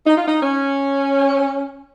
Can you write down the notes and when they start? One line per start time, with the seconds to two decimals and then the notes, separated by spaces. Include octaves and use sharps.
0.06 D#4
0.18 F4
0.28 D#4
0.42 C#4